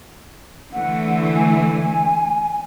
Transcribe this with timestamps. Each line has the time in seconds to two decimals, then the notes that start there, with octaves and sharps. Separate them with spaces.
0.73 D3 E3 A3 F#5
1.35 G#5